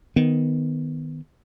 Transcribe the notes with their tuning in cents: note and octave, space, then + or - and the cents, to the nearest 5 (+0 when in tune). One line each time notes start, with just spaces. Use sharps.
D#3 +0 B3 +10